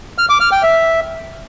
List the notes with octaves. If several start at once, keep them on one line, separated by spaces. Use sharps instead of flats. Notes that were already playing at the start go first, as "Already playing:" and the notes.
F6
D6
F6
G5
E5